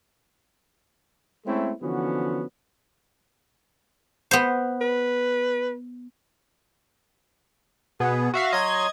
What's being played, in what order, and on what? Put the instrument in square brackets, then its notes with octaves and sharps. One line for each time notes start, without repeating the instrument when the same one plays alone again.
[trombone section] G#3 A3 C4 C#4 E4 A4
D3 E3 F3 B3 C#4 F#4
[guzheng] B3 C5
[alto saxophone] B4
[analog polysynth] B2 B3 [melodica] G#4
[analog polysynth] F#4 E5 F5
[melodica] F#3 C#5 C6 [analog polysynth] D#5 G#6